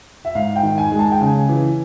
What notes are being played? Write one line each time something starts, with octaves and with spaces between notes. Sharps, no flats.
E5
G#2 F5
G5
D#3
G#5
G#3
A5
G5
C#3 G#5
E3